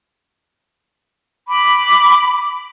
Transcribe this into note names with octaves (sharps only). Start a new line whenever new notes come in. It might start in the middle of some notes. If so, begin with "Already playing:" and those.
B5 D6